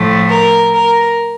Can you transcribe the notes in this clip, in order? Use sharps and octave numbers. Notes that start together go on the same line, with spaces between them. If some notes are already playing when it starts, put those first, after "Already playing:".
Already playing: A2 F3 A3
A#4
A#4